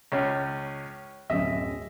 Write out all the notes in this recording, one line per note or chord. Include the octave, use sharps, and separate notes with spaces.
C#2 C#4
D1 F#2 D#5 E5